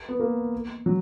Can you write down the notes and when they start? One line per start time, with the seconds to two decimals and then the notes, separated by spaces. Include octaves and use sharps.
0.09 B3
0.20 A#3
0.86 F#3